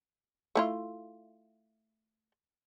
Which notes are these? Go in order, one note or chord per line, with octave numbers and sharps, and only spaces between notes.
A3 E4 F4